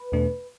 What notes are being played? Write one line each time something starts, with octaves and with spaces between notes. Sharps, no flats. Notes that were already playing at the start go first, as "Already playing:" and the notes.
Already playing: B4
E2 B2 A3 D4